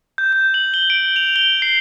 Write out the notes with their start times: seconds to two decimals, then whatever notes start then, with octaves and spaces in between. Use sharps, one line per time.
0.18 G6
0.33 G6
0.54 F#7
0.74 G7
0.90 D7
1.16 F7
1.36 G7
1.62 C7